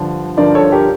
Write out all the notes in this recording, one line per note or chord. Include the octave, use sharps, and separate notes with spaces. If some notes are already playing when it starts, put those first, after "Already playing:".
Already playing: G2 D3 F3
G2 D3 F3 A#4 D5
A4 C#5
G4 A#4